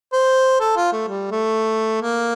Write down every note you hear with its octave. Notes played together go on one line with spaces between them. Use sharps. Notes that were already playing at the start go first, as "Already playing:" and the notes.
C5
A4
F4
A3
G3
A3
A#3